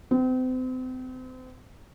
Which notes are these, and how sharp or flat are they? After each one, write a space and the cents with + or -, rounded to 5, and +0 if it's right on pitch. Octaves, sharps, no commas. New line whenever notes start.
C4 -35